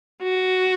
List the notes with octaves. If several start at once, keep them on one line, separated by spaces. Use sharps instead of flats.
F#4